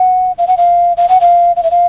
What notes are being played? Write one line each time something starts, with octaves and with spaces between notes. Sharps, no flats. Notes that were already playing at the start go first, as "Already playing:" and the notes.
Already playing: F#5
F5
F#5
F5
F5
F#5
F5
F5
E5
F5